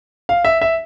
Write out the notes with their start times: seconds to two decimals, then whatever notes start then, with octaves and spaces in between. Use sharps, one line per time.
0.29 F5
0.45 E5
0.62 E5